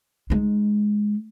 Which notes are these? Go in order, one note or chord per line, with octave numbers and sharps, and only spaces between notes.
G#3 D#4